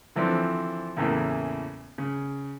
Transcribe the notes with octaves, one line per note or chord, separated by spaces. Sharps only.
D3 E3 F3 C4 D4
E2 A2 C#3 E3 A#3
C#3